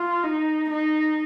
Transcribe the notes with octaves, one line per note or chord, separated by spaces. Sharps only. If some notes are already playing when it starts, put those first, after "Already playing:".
Already playing: F4
D#4
D#4